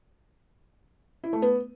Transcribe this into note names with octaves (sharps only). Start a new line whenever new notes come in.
E4
A3
B3